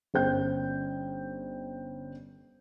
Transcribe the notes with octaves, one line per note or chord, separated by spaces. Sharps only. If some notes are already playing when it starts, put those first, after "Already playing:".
G1 C#4 C5 G5 G6